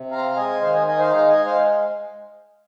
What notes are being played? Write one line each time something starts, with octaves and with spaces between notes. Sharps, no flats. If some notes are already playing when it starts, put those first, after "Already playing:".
Already playing: C3
C4 F5 A#5
G#3 D#5 G#5
D#3 C5 F5
D#5 G#5
D#4 D#5 G#5
C5 F5
G#3 F5 A#5
D#5 G#5
G#3
C5 F5